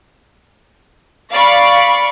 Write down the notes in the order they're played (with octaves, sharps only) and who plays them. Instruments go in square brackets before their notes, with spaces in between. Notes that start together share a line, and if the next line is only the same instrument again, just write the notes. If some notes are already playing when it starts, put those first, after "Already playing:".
[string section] D5 F5 B5 C#6